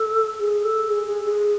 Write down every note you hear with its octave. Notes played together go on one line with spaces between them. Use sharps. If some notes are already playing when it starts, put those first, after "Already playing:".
Already playing: A4
G#4
A4
G#4
G#4
G#4